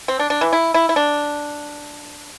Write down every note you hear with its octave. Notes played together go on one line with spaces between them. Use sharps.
C4
D4
D4
E3
E4
E4
E4
D4